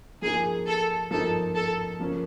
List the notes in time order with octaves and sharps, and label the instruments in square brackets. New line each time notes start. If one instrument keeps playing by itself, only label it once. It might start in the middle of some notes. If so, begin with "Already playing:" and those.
[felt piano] F3 A#3 D#4 [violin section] G#4
[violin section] A4
[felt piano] F3 A#3 D#4 [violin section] A4
[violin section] A4
[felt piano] C#3 F3 A#3 C#4